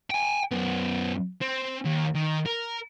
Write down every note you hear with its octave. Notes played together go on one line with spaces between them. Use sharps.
G5 G#5
F#2 B3
C4
D#2
D#3
A#4